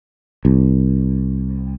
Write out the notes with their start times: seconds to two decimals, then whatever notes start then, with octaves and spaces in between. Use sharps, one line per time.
0.45 C2